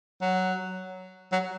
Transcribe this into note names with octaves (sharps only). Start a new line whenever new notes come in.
F#3
F#3